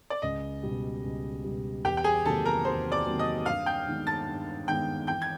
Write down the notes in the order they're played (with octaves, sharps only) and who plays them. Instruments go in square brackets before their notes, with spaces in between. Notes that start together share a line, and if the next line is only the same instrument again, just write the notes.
[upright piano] D5
[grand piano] C#2 [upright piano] D#5
[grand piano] B2 G3
C#2
B2 G3
[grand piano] E2 [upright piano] G4 G5
[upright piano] G5
G#4 G#5
[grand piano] C3 D#3 F#3 A#3 [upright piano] A4 A5
[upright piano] A#4 A#5
[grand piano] E2 [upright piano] C5 C6
[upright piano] D5 D6
[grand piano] C3 D#3 F#3 A#3
[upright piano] D#5 D#6
[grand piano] G2 [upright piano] F5 F6
[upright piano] G5 G6
[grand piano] D#3 G#3 B3 D#4
[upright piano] A5 A6
[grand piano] G2
[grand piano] D#3 G#3 B3 D#4 [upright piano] G5 G6
[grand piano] E3 [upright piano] G5 G6
[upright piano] G#6